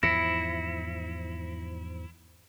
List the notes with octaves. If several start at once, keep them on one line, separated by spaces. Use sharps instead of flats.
E2 G#2 F3 E4 A#6 B6 C#7